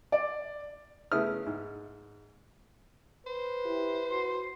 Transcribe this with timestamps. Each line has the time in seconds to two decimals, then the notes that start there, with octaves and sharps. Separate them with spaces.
0.12 D5
1.12 C#3 A3 B3 E4 D#6 F6
1.47 G#2
3.27 B4 C5
3.65 E4 G4
4.12 F#4 C6